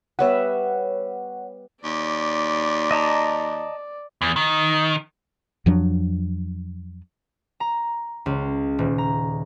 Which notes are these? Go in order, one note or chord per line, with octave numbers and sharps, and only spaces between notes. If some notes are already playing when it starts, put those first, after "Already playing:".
G3 B3 C#5 E5 F#5
D#2 D5
D#5 A5 A#5
E2
D#3
F2 F3 F#3 D4
A#5
C#2
D#1
A#5